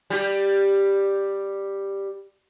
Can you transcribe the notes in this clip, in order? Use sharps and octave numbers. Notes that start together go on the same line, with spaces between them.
G3 G4